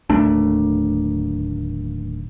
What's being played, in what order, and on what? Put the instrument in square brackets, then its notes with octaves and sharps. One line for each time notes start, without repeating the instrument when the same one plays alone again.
[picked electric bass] D1 D#2 A3 D4